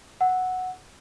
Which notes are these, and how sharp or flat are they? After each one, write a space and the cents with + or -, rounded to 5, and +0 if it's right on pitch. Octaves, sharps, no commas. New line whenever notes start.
F#5 +0 E6 -5